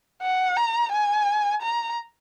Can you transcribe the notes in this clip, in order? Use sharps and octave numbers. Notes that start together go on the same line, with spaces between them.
F#5
A#5
G#5
A#5